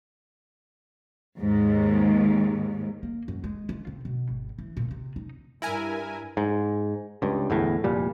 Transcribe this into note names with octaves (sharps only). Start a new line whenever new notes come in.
D#2 G#2
A#3
F#2
G#3
F4
C3
B2
G#1
E3
A#2
C3
D#4
G2 E4 A#4 G#5
G#2
C#2 G2
G1 E2 A2
F1 A#2 G3